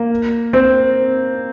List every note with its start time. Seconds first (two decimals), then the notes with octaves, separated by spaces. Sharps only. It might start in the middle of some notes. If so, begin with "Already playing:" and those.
Already playing: A#3
0.53 C4